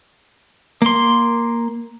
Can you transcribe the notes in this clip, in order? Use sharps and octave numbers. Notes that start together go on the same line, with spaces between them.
A#3 C6